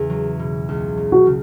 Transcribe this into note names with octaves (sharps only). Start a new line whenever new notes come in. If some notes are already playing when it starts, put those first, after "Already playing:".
Already playing: E2 C#3
F#3
B2
C#2
F#3
F#4
C#3